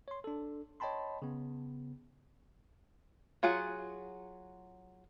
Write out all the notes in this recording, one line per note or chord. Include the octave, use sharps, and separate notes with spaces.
C#5 C6
D4 A4
C#5 D#5 G5 A5 B5 C6
C#3 B3
F#3 F4 G#4 F#5